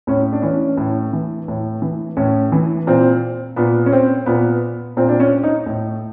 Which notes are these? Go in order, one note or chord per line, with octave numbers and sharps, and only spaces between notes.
A2 C#4
D4
E3 C#4
A2
E3
A2
E3
A2 C#4
E3
A#2 C4
A#2 B3
C#4
C4
A#2 B3
A#2 C4
D4
C#4
D#4
A2